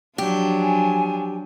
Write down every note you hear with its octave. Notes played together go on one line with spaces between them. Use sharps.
F3 F#3 D4 G4
G#5